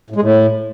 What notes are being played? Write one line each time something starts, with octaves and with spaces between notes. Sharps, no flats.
A2
G#3
A2